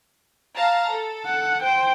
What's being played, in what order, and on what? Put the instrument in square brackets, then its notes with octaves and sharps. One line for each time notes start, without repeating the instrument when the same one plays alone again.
[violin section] F5 A5 A#5
A4
[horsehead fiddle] F#5
[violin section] C5 [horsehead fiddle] G5